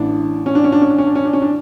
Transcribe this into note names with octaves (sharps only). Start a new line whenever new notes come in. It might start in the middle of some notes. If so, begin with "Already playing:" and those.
Already playing: A1 A2 E3 D4
C#4
D4
C#4
D4
C#4
D4
C#4
D4
C#4
D4
C#4
D4